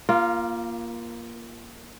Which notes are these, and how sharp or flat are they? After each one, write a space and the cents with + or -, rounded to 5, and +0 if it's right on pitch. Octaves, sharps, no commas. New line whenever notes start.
A#3 +15 F4 -15